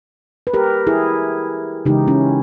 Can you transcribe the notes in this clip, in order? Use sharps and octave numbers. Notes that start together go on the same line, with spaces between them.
B4
G4 A#4
E4 G#4
C#3 E3 G#3 D#4 G4
C#4 E4